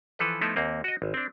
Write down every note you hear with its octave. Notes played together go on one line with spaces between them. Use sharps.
E3 F3 A4 B4
F3 A3 B3 D#4 E4
D#2 A#3 C4
F#4 D#5
G#1
C4 D4